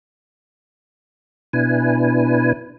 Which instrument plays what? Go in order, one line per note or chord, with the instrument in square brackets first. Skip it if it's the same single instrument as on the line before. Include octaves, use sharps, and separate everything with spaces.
[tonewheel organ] B2 D4 E4 B4 G#5